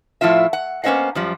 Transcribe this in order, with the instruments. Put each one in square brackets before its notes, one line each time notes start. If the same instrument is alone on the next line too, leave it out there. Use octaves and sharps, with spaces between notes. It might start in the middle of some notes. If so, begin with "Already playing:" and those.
[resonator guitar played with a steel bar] A2 F3 E4 F4 E5
F#5
A#3 B3 C#4 C5 D#5 F#5
F#2 F3 G3